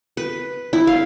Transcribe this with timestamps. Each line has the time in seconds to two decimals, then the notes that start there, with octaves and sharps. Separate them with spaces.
0.17 B4
0.73 E4
0.87 F5